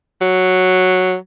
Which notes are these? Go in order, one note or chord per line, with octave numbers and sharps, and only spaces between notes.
F#3